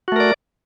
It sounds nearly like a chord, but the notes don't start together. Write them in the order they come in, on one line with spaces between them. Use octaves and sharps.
F#4 A3 A#4 D5